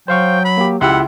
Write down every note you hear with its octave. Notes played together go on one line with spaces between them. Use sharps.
F#3 C5 F5 G5 C#6
B5
A#3 G4
C#2 E4 G4 E5 F#5 C6 E6